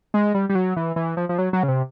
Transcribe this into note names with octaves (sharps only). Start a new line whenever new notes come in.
G#3
G3
G3
F#3
E3
E3
F3
F3
F#3
F#3
C#3
C3